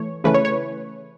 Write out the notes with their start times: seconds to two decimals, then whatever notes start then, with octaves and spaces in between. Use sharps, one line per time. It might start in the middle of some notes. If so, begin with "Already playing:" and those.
Already playing: E3 A3 C#5
0.24 C#3 E3 A3 C#4 B4
0.34 C#5
0.45 C#5